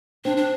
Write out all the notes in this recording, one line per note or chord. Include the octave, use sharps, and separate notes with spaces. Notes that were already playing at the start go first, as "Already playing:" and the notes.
C4 D4
D4